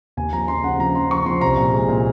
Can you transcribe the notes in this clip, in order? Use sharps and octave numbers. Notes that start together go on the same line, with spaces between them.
D#2 G#5
F3 A#5
C#3 C6
C#3 F#5
F3 A#5
C#3 C6
C#3 C#6
F3 C6
C2 A#5
A#2
G#3
A#2